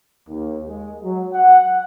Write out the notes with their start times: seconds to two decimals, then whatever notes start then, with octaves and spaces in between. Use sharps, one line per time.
0.28 D#2
0.67 G#3
1.03 F#3
1.33 F#5